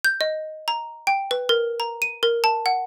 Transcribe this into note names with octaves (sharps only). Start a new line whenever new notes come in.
G6
D#5
A#5
G5
B4
A#4
A#5
D#7
A#4
A5
F#5